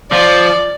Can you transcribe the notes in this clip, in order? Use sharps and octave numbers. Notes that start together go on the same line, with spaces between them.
F3 D5